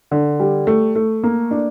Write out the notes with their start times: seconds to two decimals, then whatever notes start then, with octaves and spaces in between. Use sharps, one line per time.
0.11 D3
0.40 G3
0.67 A3
0.95 A3
1.23 A#3
1.51 D4